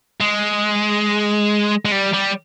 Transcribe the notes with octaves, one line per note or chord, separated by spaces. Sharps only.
G#3
G#3
G3
G3